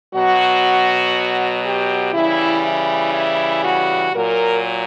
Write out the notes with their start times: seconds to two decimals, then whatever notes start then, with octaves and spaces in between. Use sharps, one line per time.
0.14 B2 F#3 F#4
1.64 G4
2.13 C#3 E3 G3 E4
2.62 E4
3.13 E4
3.62 F#4
4.12 A#2 F#3 A#4